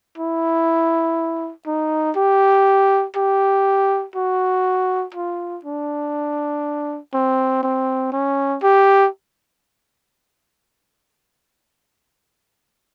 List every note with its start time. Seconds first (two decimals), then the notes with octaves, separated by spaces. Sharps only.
0.18 E4
1.67 D#4
2.16 G4
3.16 G4
4.16 F#4
5.14 F4
5.65 D4
7.14 C4
7.63 C4
8.12 C#4
8.63 G4